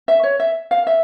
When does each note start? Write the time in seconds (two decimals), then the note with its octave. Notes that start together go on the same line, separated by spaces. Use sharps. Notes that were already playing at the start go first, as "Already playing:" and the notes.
0.08 E5
0.23 C#5
0.40 E5
0.71 F5
0.87 E5